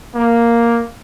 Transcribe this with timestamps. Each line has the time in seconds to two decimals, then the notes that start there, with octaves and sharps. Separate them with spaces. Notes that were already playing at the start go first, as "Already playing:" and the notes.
0.15 A#3